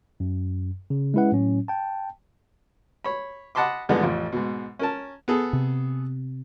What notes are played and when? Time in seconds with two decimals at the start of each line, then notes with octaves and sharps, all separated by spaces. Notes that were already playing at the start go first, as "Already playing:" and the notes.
0.20 F#2
0.90 C#3
1.14 G#3 C#4 E4 B4 F#5
1.32 A2 F#3 C#4
1.68 G5 A5
3.04 C#5 B5
3.55 D#5 F#5 A5 B5 C6 D6
3.89 F2 D3 E3 G3 G#3 B3
4.03 A1 F2 F4
4.32 G#2 B2
4.79 C#4 A#4 A5
5.28 B3 G#4 A4
5.53 C3